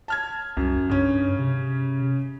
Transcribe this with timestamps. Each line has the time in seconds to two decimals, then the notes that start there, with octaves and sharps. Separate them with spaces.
0.08 A5 F6 G#6
0.57 C2 F#2
0.89 G2 C#3 C#4
1.39 C3